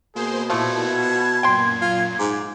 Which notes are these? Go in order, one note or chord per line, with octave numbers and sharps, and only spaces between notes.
B2 A#3 G#4 C5 C6
A#2 F3 A3 E4 G#6
A5
F#2 A#2 G5 C6
F4
G#2 D6